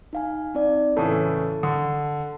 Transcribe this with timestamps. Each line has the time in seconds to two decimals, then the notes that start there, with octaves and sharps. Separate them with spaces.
0.13 D#4 F5 G#5
0.55 C4 D#4 D5
0.96 A2 C#3 E3 A4 A5
1.63 D3